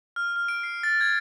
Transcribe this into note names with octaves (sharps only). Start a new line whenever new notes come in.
F6
F6
D7
C7
A6
G#6